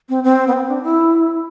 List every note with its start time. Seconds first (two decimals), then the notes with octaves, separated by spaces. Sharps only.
0.09 C4
0.24 C4
0.48 B3
0.53 C4
0.68 D4
0.83 E4